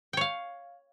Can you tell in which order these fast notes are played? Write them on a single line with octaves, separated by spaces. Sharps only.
G5 C#5 F5